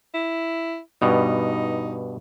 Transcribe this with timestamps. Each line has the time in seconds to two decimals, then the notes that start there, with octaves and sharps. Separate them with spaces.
0.14 E4
1.02 G2 B2 D#4